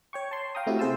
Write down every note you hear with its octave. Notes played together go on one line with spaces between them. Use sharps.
C#5 G5 C#6
A5 C6
F5 G5 A#5 D#6
A3 C4 E4 F#4 G4
C3 G#4 C5 F5 A5 E6